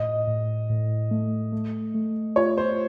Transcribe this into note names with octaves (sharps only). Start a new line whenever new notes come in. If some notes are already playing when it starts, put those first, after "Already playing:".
Already playing: A2 D#5
A2
A2
A3
A3
A3
F4 C#5
C5